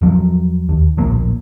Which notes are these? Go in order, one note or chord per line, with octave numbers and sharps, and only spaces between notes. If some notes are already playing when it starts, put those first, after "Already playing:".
E2 F3 F#3
D#2
D1 A#1 A#3